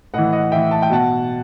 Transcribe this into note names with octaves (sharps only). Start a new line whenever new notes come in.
A2 E3 D#5 F#5
D#5 F#5
A2 E3 E5 G5
A5
G5
B2 F#5 A5